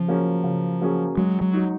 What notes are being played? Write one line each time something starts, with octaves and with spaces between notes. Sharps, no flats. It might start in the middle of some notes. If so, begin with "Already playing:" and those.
Already playing: C#3 F3
F#3 A#3 C#4 G#4
C#3
F#3 A#3 C#4 G#4
F#3 G#3
F#3
D#4 F#4